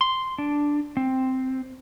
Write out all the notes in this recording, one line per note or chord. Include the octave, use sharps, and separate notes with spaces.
C6
D4
C4